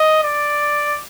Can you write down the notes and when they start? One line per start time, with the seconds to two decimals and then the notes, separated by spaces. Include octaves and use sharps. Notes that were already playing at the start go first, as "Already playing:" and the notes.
Already playing: D#5
0.24 D5